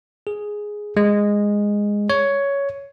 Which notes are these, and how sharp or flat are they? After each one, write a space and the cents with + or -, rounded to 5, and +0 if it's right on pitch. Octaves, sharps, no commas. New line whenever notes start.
G#4 +0
G#3 -10
C#5 +10